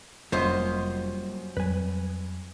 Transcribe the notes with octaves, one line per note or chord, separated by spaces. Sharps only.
F1 F#2 G3 A#3 F4 C5 D#5
F2 F#3 G3 B4 G#5